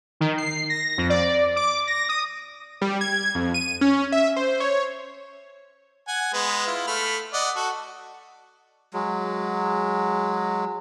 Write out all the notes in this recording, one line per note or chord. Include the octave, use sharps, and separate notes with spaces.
D#3
C7
A#6
F2
D5
D6
A#6
D#6
G3
G#6
F2
D#7
C#4
E5
C5
C#5
F#5 G#5
G#3 B3 B4
E4 F4
A3 B5 F6
D5 D#5 F#5
F#4 A4
F#3 G#3